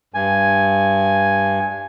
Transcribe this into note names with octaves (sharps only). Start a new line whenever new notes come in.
G2 G#5